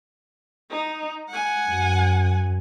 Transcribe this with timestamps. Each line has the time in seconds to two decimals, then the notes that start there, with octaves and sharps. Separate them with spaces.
0.70 D#4
1.29 F#5 G#5
1.69 F#2